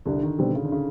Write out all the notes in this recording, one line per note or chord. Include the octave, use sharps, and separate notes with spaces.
C2 D3
D#3
B2 D3 G3 C4
C#3
D3
C#3